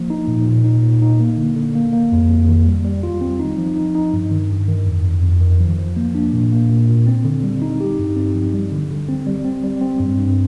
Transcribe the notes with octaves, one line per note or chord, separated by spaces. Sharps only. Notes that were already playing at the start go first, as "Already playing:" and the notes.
Already playing: F3 A#3
D#4
A#2
A#2
D#4
A#2
D#4
A#3
D3
D3
A#3
A#3
F2
F2
D#3
G3
G3
F4
C4
D#4
F3
D#4
D#4
G2
D#3
G2
D#3
F2
F2
F2
D#3
F3
F3
A#3
D4
A#2
A#3
A#2
A#2
C4
D3
G3
D#4
G4
G2
C4
F3
G3
D3
D3
C4
G3
C4
G3
C4
G2
G2